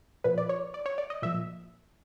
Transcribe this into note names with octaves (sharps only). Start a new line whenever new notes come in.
A#2 F3 B4
D5
C#5
D5
C#5
D5
D#5
A#2 F3 E5